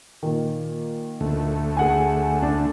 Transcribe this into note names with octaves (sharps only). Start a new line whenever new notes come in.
A#2 D#3
D2 A3
G#4 F#5 G#5
D4